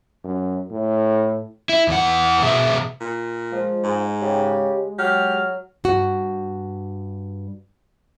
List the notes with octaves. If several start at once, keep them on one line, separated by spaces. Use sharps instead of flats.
F#2
A2
E4
E2 E3 F#5
B2 G#4 E5
A#2
F3 G#3
G#2
C#3 G4
F#3 G4 F6
G2 F#4